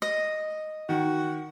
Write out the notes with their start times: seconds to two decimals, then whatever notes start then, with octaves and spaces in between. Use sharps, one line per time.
0.02 D#5
0.89 D#3 F#4